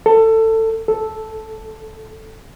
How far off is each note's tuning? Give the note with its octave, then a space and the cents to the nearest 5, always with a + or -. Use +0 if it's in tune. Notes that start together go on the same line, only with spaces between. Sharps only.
A4 +20
A4 -5